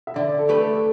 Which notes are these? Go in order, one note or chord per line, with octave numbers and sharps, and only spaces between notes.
E5
D3 D5
A4
A3 G4 B4
A4